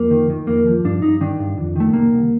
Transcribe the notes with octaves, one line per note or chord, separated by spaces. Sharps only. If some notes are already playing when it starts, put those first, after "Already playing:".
Already playing: F2 A#3
D#3
D#3
F2 A#3
F3
G2 D4
G2 D#4
D#3 D4
G2
F2
D#3 A3
C2 A#3
C2